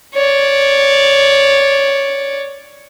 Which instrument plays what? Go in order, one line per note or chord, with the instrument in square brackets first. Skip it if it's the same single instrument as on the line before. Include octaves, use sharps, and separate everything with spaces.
[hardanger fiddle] C#5 D5